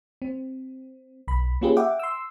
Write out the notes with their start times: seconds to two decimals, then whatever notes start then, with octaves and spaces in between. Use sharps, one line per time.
0.22 C4
1.28 B1 B5
1.61 A#3 C#4 F4 G4 G#4 B4
1.77 E5 F#5 G5 D6
1.99 C6 E6